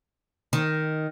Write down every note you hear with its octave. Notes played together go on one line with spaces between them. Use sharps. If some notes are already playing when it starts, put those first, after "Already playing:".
D#3